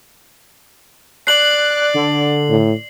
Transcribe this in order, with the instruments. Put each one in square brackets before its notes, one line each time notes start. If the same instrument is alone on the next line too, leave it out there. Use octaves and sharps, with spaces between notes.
[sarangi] D5 [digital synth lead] F#6 [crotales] C7 F#7
[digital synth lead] D3
[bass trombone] A2